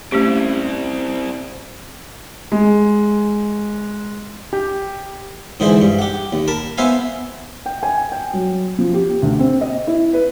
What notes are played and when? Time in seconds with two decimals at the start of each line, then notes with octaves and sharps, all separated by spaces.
0.12 A3 C4 C#4 E4 G4
2.52 G#3
4.53 G4
5.60 G#2 D3 E3 G#4 C5
5.82 G2
5.99 G4 F#5
6.33 D#2
6.48 A#4 A5 B5
6.78 B3 B4 C5 E5 F5 G#5
7.66 G5
7.83 G#5
8.12 G5
8.33 F#3
8.79 F3
8.94 G4
9.22 D2
9.39 C4
9.61 D#5
9.87 E4
10.13 B4